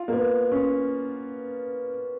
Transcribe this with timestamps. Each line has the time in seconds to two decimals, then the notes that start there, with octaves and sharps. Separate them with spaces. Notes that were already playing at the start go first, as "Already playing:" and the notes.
Already playing: F4
0.08 A#3
0.13 B3
0.52 C#4